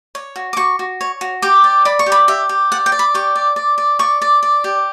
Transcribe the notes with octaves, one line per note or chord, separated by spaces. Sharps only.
C#5
F#4
D6
F#4 C#6
F#4
C#5
F#4
G4 D6
D5
D5 B5
C#6
G4
B5
G4 E5
G4
D5 F#5
G5
D5
B5
G4 C#6
D5
D5
D5
D5 C#6
D5
D5
G4